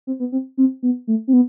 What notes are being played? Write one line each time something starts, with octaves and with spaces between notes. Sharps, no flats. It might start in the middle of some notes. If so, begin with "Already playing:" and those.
C4
B3
C4
C4
B3
A3
C4
B3